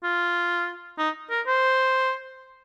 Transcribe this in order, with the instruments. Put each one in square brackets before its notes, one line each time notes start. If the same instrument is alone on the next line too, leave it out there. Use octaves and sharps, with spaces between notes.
[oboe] F4
D#4
A#4
C5